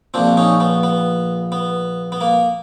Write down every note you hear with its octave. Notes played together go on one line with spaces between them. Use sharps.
A#1 A#2 C4 D4
C#4 D#4
B3
B3
B3
B3
A#3